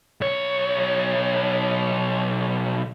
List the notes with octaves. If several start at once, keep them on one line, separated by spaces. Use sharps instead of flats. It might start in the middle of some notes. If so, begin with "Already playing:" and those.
B1 C#5